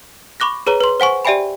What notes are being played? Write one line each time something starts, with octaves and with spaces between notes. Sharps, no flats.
B5 C#6 D6 F#6 A#6
G#4 B4 C#5 A#5
B4 C6
C5 F#5 G#5 C#6
G4 D5 E5 G5 G#5 B5